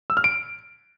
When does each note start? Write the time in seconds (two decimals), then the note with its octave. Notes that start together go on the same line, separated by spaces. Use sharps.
0.10 E6
0.17 F6
0.24 D7